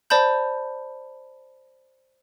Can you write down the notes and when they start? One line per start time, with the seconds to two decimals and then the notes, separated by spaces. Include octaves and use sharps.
0.10 C5 D5 A5 B5 G6